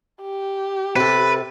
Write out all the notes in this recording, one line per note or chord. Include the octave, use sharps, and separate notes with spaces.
G4
C3 A4 B4